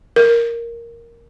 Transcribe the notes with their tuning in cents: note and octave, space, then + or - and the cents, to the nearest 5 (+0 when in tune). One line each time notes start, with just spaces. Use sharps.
A#4 +0